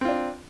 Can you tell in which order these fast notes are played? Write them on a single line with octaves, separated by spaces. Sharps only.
C4 F4 D4